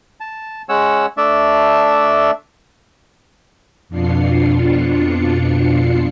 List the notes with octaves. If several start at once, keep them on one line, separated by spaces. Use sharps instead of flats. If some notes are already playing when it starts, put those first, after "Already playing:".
A5
G#3 C#4 C#5 F#5 E6
A3 D4 D5 E5
F2 B2 D4 F4 C7 C#7